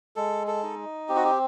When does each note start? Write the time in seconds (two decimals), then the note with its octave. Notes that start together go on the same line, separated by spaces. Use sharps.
0.16 G#3 A4
0.47 A4
0.63 D#4
1.09 C4 G4
1.16 F#4
1.24 G4